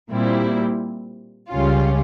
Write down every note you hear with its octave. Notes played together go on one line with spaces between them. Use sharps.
A#2 G3 C4 E4
C#2 C#3 G3 C#4 F4